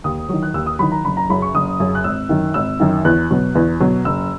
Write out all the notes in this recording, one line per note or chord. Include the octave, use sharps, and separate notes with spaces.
D#2 D#6
D#3 F#3
F#6
D#2 E6
D#6
D#3 F#3 B5
A#5
F#1 B5
A#5
F#2 C#3 F#3 B5
C#6
F#1 D#6
F#2 C#3 F#3
F#6
G#1 E6
F#2 D#3
G#1 E6
F#2 D#3
E2 F#6
B2 F#3
E2
B2 F#3
F#1 E6